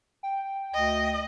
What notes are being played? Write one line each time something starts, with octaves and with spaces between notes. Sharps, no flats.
G5
D2 D#5